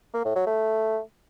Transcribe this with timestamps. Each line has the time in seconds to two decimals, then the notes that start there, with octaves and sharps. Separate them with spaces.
0.14 A#3
0.25 A2
0.36 F#3
0.46 A3